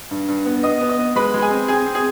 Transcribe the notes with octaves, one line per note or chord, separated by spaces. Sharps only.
G2
G2
B3
B3 D#5 D#6
B3
D#5 D#6
B3
G#3 B4 B5
G#3
G#4 G#5
C4
C4 G#4 G#5
C4
G#4 G#5